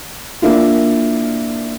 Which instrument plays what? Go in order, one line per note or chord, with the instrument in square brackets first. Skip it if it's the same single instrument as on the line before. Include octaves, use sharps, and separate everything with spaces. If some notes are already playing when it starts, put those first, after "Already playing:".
[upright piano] A#3 D4 E4 F4